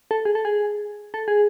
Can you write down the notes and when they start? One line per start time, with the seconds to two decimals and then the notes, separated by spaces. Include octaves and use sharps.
0.11 A4
0.25 G#4
0.35 A4
0.45 G#4
1.14 A4
1.28 G#4